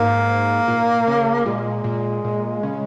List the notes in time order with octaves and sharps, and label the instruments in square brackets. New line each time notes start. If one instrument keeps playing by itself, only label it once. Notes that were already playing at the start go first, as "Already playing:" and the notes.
Already playing: [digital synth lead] G#2 [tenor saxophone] A#3
[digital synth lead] A#2
C#3
[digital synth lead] A#2 [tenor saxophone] G#3
[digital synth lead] A#2
A#2
C#3